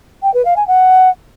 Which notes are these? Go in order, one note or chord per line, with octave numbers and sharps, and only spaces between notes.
G5
B4
F5
G#5
F#5